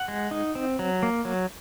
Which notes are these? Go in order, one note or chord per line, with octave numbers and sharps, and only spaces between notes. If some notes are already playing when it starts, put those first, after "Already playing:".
Already playing: F#5
G#3
D#4
C4
F#3
A#3
F#3